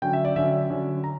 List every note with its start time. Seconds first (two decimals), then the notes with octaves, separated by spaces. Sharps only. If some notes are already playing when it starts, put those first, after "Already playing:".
0.02 D3 F#3 C#4 G5
0.13 E5
0.25 D5
0.36 D3 F#3 C#4 E5
0.70 D3 F#3 C#4
1.04 A#5